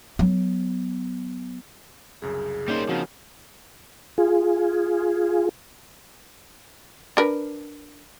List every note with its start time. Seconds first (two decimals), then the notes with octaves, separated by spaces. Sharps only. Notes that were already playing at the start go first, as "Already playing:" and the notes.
0.19 F#3 B3
2.22 C2 F#2 C#3 G#4
2.68 G3 A#3 C#4 D#4 C5
2.89 C#3 F3 C4 D#4 F#4
4.18 F4 G#4
7.17 D4 A#4 B4